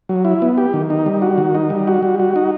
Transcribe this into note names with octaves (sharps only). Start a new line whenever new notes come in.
F#3
E4
B3
G4
D#3
D#4
G3
F#4
D#3
D#4
G3
F#4
G3
F#4
D#4